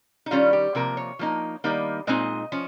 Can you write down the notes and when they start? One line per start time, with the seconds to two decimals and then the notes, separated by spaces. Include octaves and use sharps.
0.26 D#4
0.31 D#3 G3 C#4 F4
0.53 G4
0.75 C3 F3 A#3 A#4
0.97 C#5
1.19 F3 A#3 D#4
1.64 D#3 G3 A#3 D#4
2.07 A#2 G#3 C4 D#4 D#5
2.52 F3 C#4